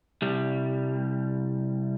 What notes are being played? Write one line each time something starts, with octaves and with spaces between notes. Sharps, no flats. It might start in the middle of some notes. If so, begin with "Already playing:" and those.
C2 G3